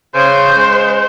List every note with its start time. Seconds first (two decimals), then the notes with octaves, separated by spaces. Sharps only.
0.15 C#3 C5
0.57 G#3